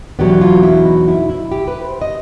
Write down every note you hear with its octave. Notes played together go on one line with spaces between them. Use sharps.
E2 B2 F#3 B3 D4 G4
F4
E4
D#4
E4
E4
G4
B4
C5
D#5